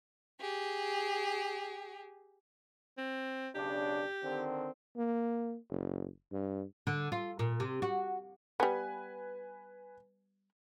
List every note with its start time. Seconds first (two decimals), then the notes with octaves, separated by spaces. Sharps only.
0.41 G4 G#4
2.97 C4
3.55 B1 C#3 D4 G4
4.23 D3 D#3 C4
4.97 A#3
5.70 F#1
6.33 G2
6.87 D3
7.12 F4
7.39 A#2
7.60 C3
7.82 F#4
8.60 G3 B3 B4 G#5